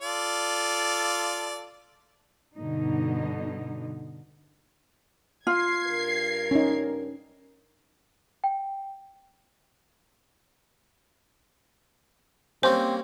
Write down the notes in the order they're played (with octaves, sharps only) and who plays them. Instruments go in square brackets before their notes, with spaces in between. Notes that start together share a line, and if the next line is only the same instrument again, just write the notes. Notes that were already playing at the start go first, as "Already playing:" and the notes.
[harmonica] F4 A4 D5
[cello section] G2 B2 D3 D#4
[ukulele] F4 [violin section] G#6 C7
[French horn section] G2 A#4
[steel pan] C#4 D#4
[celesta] G5
[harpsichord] G3 A#3 C#4 [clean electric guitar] C4 [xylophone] C5